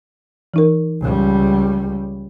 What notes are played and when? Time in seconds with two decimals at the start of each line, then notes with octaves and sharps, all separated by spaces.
0.54 E3 D#4 A#4
1.01 C#2 G3